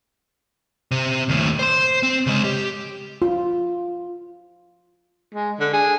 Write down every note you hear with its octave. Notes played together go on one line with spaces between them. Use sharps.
C3
D#2 A2
C5 C6
C4
C#3 G#3
G4
F4
G#3
D3
G#4